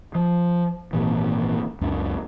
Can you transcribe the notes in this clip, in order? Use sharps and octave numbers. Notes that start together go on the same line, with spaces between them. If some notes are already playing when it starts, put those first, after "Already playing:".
F3
G#1 A#2 E3
C#2 F#2 D4